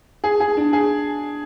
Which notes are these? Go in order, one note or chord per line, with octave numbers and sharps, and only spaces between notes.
G#4
G#4
D4
G#4